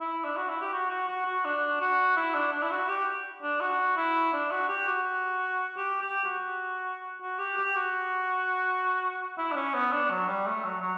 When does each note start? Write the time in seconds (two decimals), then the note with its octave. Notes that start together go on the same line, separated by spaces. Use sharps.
0.01 E4
0.24 D4
0.37 F#4
0.48 E4
0.61 G4
0.72 F#4
0.90 F#4
1.08 F#4
1.26 F#4
1.45 D4
1.80 F#4
2.16 E4
2.34 D4
2.52 D4
2.63 E4
2.71 F#4
2.89 G4
3.42 D4
3.61 F#4
3.97 E4
4.33 D4
4.51 F#4
4.69 G4
4.87 F#4
5.77 G4
6.01 G4
6.25 F#4
7.22 F#4
7.39 G4
7.57 G4
7.75 F#4
9.38 E4
9.52 D4
9.55 C#4
9.74 B3
9.92 D4
10.10 F#3
10.27 G3
10.46 A3
10.64 F#3
10.81 F#3